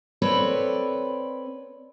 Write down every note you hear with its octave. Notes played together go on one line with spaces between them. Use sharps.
C4 A4 B4 C#5 D5